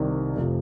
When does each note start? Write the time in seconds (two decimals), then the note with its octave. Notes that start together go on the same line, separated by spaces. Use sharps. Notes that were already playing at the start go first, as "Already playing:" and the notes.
Already playing: C2 C3 D#3
0.36 F1 C3 F3